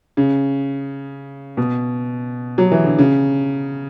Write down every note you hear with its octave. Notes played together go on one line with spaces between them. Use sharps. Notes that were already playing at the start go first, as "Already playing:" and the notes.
C#3
B2
F#3
E3
D3
C#3